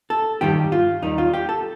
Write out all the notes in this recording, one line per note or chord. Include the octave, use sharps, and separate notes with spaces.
A4
G2 D#3 G3 G4
F4
D#2 D#3 G3 D#4
F4
G4
A4